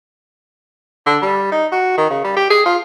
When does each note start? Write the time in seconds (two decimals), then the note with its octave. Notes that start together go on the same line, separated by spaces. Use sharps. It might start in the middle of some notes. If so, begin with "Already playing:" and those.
1.06 D3
1.22 G3
1.52 D#4
1.72 F#4
1.97 D#3
2.10 C#3
2.24 G3
2.36 G4
2.50 G#4
2.66 F4